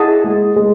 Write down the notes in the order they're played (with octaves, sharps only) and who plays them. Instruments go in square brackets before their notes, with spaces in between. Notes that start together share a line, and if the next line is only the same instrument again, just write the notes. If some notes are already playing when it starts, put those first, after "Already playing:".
Already playing: [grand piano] E4 [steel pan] G#4 D#5 F#5 A5
[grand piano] G#3
G#3